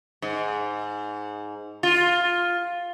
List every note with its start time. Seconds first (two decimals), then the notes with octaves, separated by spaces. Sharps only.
0.22 G#2
1.83 F4